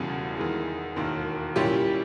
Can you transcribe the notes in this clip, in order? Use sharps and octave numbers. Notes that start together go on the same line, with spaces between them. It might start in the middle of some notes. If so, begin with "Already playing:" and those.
Already playing: E1 E2 C#3 G3
E2 D#3 G#3
E1 D#2 D#3
A#2 G3 C#4 E4 G4